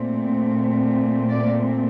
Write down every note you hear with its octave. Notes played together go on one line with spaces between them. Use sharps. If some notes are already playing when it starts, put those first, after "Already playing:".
Already playing: A#2 A3 C4
D5